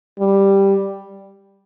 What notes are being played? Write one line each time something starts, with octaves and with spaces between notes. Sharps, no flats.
G3